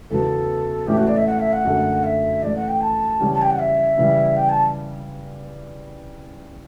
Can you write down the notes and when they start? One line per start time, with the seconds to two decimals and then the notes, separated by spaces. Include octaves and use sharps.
0.10 E2 C#3 F#3 B3 A4
0.87 A2 E3 A3 C#4 E4 G4
0.97 F#4
1.07 D5
1.17 E5
1.26 F#5
1.39 E5
1.53 F#5
1.65 F#2 D3 F#3 A3
2.04 E5
2.42 E3 A3 C#4 D5
2.56 F#5
2.68 G5
2.81 A5
3.20 C#3 E3 G3 C#4 G4
3.34 A5
3.42 G5
3.50 F#5
3.59 E5
3.98 C#3 E3 G3
4.36 G5
4.49 A5